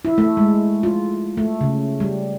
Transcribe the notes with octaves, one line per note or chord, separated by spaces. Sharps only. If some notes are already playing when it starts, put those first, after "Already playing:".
E4
A3
G#3
F4
A3
C#3
G3